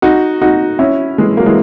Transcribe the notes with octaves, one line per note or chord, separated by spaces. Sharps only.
D#4 F#4
D#4 F#4
C#4 E4
E3 G#3
F#3 A#3
E3 G#3